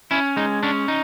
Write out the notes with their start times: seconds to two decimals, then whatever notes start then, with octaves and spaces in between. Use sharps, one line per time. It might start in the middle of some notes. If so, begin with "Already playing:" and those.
0.11 C#4 E4
0.36 G#3 D#4
0.63 C#4 D4
0.88 D#4